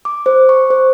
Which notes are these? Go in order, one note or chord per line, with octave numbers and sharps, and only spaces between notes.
D6
C5
C#6
C5